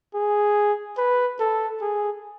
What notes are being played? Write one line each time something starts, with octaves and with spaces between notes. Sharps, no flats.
G#4
B4
A4
G#4